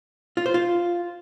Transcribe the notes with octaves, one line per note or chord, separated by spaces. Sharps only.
F4
C5
F4